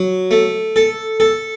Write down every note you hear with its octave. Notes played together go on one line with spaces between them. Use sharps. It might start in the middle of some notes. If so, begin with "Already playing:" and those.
Already playing: F#3
A3
A4
A4